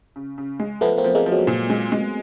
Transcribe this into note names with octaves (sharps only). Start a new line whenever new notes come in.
C#3
C#3
G#3
F3 A3 B3
A#3 C4
F3
G#3 A#3
F3
F#3 G#3
A#2
G#3
G#3